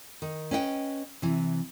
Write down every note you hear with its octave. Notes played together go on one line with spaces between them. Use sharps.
D#3
C#4 B4 D#5 E5 G5
C3 E3